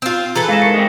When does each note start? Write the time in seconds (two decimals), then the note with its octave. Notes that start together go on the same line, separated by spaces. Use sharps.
0.02 C4 F4
0.35 E3 G#4 A4 B4 A#5
0.49 G#2 F5 A#6 E7
0.62 A#4 C#6 C#7
0.74 G#3 C4